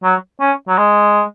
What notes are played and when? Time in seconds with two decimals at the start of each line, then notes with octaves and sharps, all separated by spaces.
0.03 F#3
0.40 C#4
0.68 F#3
0.78 G#3